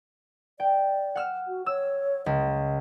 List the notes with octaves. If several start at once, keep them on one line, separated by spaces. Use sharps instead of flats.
D5 G5
F#5 F6 E7
F#4
C#5 E6
C#2 D#5